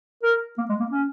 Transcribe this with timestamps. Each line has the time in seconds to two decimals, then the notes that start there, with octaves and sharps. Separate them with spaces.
0.23 A#4
0.58 A#3
0.69 G#3
0.80 A#3
0.92 C#4